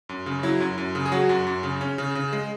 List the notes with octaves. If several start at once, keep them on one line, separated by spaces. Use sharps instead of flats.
F#2
C#3
F#3 E4
F#2
F#2
C#3
G#4
F#3 F#4
F#2
F#2
C#3
C#4
C#3
C#3
G#3